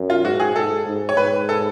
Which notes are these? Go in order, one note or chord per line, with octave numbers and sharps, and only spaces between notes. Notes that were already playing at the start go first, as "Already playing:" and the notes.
Already playing: F#2
F4
G#2 F#4
G#4
G#2 A4
G#2
C#5
G#2 B4
A4